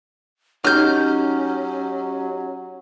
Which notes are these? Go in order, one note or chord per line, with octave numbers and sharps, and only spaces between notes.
F#3 C#4 D#4 G4 F6 G6